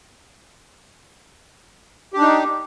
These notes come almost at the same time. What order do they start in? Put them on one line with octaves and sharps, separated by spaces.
G4 D4 D#4